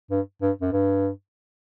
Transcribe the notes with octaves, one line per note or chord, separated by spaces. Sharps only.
G2
G2
F#2
G2